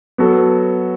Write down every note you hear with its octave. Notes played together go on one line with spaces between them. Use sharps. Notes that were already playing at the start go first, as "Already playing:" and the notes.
F#3 B3 F#4 A4